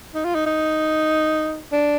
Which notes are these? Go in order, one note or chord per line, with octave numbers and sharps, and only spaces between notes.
D#4
F4
D#4
D#4
D4